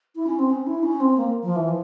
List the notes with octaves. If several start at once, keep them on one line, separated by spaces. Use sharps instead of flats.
E4
C#4
C4
C#4
E4
C#4
C4
A#3
F3
E3
F3